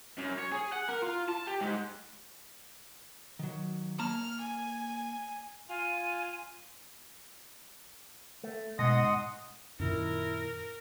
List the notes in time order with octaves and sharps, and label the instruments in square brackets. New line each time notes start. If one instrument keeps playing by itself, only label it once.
[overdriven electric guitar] F#2
C#5
G#4
F#5
A#4
F4
A5
G4
G#2
[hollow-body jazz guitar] D#3 F#3
[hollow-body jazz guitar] A#3 A5 A#5 [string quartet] F6
[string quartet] G#5
[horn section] F4 [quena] G#5
[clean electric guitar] A3
[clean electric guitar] G#2 [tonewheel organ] B2 A#6 [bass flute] D#5 [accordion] F#5 C6 D#6
[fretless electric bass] F#2 A#2 D#3 [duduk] E4 [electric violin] A#4